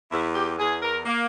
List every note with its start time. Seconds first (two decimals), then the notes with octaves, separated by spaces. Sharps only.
0.12 E2 E4
0.35 G4
0.59 E2 G#4
0.82 A#4
1.06 A#3